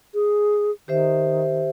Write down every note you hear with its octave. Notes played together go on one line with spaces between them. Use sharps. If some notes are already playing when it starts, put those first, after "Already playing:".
G#4
D#3 G4 C5 E5